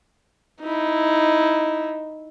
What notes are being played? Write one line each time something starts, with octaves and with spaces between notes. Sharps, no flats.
D#4 E4